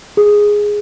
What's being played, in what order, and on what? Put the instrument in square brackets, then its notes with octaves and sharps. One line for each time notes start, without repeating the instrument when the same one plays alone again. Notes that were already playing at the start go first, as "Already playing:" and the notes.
[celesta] G#4